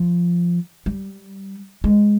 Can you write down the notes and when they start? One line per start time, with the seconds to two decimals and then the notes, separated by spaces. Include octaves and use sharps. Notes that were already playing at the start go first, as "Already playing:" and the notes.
Already playing: F3
0.86 G3
1.84 G#3